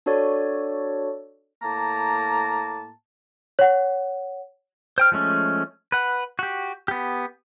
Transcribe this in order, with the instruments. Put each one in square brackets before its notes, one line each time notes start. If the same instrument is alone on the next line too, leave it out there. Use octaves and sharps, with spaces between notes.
[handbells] D4 F#4 A4 C#5 D5
[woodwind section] A2 A#3 A5 A#5
[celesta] C#5 F#5
[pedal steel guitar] C5 G5 F6
F3 G#3 A3 C#4
B4 F#5
F#4 G4
B3 G4